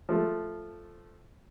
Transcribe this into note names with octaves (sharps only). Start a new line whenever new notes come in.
F3 A3